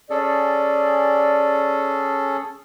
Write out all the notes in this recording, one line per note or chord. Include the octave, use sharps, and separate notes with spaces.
C#4 G#4 A4 D5